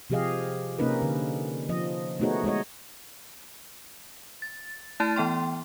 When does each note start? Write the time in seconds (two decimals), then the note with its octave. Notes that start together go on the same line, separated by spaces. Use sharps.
0.10 C3 F3 G4 G#4 D#5 F5
0.79 C3 A#3 C#4 D#4 A#4 B4
1.02 D3
1.69 F3 D#5
2.20 A3 B3 D#4 F#4 G#4 C#5
2.44 G#3 F#4 C#5 D#5
4.42 A6
5.00 A3 E4 A5 F6 A6 D#7
5.16 E3 B3 G5 C6